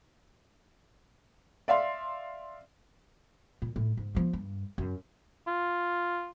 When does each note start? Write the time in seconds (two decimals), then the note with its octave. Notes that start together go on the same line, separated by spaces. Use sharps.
1.68 D5 E5 F5 C6
3.62 A#2
3.76 A2
3.97 G#2
4.15 F3 B3
4.33 G2
4.78 F#2
5.47 F4